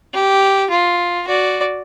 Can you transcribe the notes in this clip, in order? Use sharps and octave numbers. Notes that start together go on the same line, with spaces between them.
G4
F4
F#4 D5